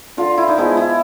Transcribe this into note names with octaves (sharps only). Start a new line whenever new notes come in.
D3 F4
E4
D#4
F3 G#3 B3 E4
E4